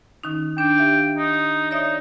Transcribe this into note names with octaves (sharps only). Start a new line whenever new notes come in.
D#3 C#4 D#4
D4 G5
G4 E5 F5
D#4
D#4 C#5 D5 E5